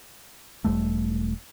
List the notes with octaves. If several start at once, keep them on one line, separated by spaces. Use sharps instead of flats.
E1 E2 G3 A3